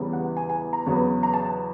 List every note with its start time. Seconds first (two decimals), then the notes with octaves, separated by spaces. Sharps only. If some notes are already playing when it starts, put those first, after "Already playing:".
Already playing: E2 C#3 E3 G3 B3
0.13 F#5
0.37 G#5
0.50 G#5
0.73 A#5
0.86 E2 C#3 F#3 B3
1.23 A#5
1.34 A5